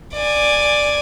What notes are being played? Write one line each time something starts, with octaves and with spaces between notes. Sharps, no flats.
D5 G#5